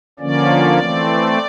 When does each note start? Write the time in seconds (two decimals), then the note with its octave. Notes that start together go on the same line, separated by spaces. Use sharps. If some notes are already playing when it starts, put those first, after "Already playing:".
0.19 D3 F3 A#3 C#4 D5
0.79 E3 A3 C4